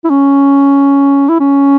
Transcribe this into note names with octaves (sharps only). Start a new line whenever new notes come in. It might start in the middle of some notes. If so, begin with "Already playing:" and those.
E4
C#4
E4
C#4